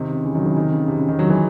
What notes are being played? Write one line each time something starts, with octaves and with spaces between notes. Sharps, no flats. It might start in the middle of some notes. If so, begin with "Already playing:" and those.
Already playing: C3 D#3
C#3
C#3 E3
D#3 F#3
C#3 E3
C3 D#3
C#3
C3
C#3
C3 D#3
D#3 F#3
E3 G#3